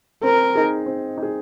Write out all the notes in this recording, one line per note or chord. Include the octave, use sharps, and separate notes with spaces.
C4 A#4
D#4 G#4
C4
D#4
G#4